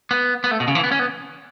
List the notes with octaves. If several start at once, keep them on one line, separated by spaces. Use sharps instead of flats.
B3
B3
A3
B2
C#3
E3
B3
C#4
B3